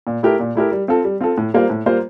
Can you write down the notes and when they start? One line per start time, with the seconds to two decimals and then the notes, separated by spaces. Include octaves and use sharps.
0.07 A#2
0.23 A3 E4 G4 A#4
0.40 A#2
0.55 A3 E4 G4 A#4
0.72 G3
0.88 C4 F4 A4
1.04 G3
1.20 C4 F4 A4
1.38 A2
1.54 G3 A#3 F4 C5
1.70 A2
1.86 G3 A#3 F4 C5